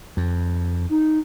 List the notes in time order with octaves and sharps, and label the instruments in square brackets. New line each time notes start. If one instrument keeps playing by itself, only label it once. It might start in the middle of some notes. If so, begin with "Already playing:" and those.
[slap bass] F2
[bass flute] D#4